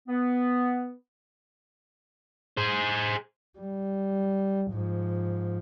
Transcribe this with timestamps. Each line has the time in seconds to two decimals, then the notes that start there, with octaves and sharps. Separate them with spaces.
0.08 B3
2.57 G#4 C5
3.59 G3
4.72 G#2 F3